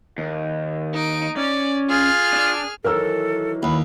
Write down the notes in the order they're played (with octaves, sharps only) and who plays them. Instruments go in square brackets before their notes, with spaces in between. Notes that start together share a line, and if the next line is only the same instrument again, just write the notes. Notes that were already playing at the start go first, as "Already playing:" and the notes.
[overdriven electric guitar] D#2
[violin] D#4 D7
[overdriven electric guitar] C#4 [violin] D5
[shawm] F4 [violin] G#4 F6
[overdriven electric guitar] D4 D5
[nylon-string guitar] D#3 E3 F#3 [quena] A4 [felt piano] A#4 E6
[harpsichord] D#2 [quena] B5